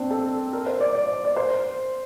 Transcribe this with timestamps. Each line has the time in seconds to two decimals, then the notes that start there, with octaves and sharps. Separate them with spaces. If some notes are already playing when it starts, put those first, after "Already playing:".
Already playing: C4 D4
0.10 A4
0.53 A#4
0.66 C5
0.80 D5
0.95 D5
1.25 D5
1.36 C5